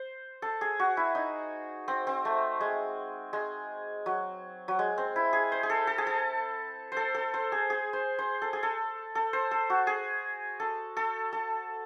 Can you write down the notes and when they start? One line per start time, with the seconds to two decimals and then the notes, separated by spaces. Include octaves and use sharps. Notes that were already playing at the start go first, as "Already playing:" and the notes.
Already playing: C5
0.42 A4
0.61 G#4
0.80 F#4
0.97 E4
1.15 D#4
1.88 C4
2.07 C4
2.25 A3
2.61 G#3
3.33 G#3
4.06 F#3
4.68 F#3
4.79 G#3
4.98 C4
5.16 E4
5.33 G#4
5.52 C5
5.63 G#4
5.70 A4
5.87 A4
5.98 G#4
6.07 A4
6.92 A4 C5
7.14 A4
7.34 C5
7.52 G#4
7.70 G#4
7.93 C5
8.19 C5
8.42 A4
8.53 G#4
8.63 A4
9.15 A4
9.33 C5
9.51 A4
9.70 F#4
9.87 G#4
10.60 A4
10.97 A4
11.33 A4